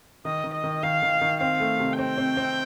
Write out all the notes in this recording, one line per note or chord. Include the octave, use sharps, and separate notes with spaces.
D#3 D#5
D#3
D#5
D#3
D#3 F5
D#3
D#3
C4 F5
A3
C3
C4 G5
C4
C4